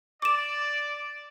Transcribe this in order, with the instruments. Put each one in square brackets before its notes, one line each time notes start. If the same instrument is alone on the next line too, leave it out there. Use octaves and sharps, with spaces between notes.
[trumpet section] D5 [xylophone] D6 E7